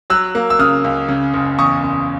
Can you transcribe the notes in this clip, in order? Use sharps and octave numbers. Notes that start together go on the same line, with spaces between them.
F#3 E6 F#6
A#3
E6
C#3 D#6 F6
C#2
C#3
F#1
E2 C#6 D#6
F#1